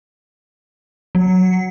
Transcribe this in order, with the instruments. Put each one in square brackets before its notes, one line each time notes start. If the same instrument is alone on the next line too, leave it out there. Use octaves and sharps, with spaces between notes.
[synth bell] F#3